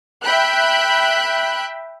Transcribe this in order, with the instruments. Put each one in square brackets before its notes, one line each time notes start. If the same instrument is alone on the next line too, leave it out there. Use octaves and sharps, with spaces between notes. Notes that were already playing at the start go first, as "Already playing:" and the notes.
[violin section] E5 G5 B5 F#6